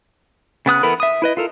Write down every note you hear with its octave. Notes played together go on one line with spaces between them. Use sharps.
C#3 B3 D#6 F#6
E3 B3 A4 A#4 B5
E5 D#6
E4 B4 D#5
F4 A4 A#4